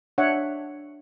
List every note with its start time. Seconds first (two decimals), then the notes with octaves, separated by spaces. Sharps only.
0.18 D4 C#5 E5 F#5